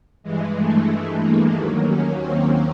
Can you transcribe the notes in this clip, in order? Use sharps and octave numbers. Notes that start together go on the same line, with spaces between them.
G2 E3 G#3
A3
G#3
A#3
D#2 D#3 F#3 A#3
C#4
C4